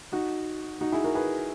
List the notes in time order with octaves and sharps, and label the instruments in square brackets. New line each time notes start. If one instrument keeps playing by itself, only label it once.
[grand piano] D#4 F#4
D#4 F#4
E4 G#4
F#4 A#4
G#4 B4